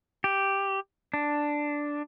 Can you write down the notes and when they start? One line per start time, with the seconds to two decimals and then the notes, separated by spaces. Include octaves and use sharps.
0.24 G4
1.14 D4